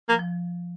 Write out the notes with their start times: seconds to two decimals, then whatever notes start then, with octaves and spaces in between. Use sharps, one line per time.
0.09 F3 A#3
0.19 F3